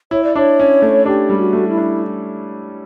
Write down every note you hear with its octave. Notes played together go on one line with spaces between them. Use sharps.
E4 C#5
D5
D4 C#5
C#4
A3
D4 G4
G3
F#4
A3
E4
D4